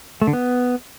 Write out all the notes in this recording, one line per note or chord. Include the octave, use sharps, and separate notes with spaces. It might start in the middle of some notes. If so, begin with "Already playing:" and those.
A3
D3
B3